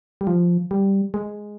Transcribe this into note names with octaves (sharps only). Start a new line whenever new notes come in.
G3
F3
G3
G#3